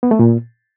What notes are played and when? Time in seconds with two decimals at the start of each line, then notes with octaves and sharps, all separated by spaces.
0.03 B3
0.11 A3
0.19 A#2